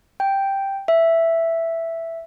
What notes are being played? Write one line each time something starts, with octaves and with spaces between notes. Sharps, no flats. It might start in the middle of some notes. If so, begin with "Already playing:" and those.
G5
E5